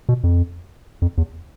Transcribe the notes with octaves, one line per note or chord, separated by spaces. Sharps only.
B2
F2
F2
E2